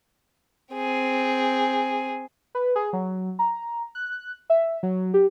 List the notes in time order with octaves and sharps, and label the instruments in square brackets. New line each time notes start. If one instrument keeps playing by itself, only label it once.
[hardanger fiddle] C4 G#4
[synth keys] B4
G#4
F#3
A#5
F#6
E5
F#3
G4